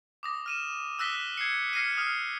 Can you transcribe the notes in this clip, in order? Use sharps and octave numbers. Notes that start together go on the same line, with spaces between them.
D6 D#6 A#6
F6 D#7 E7
D#6 E6 F#6 A#6 B6 G7
G#6 C7 C#7
F6 A#6 C7 C#7 D#7
D#6 F6